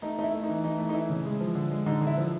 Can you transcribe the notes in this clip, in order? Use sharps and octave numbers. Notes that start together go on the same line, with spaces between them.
A3 D#4
A3 D#4 E4
A3
D#4
E3
E3 D#4
A3
D#4
E3 E4
C#3
G#3
F3
D3
G#3
D3 D#4
D3
E4
F3